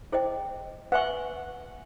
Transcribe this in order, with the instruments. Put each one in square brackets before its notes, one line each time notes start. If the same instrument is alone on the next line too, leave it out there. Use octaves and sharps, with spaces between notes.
[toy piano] E4 G#4 C5 D#5 G5
[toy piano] B4 E5 G#5 C#6 [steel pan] F#5